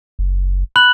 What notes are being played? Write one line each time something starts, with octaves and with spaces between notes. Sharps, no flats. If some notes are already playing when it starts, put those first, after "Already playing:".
F#1
B5 F#6 F#7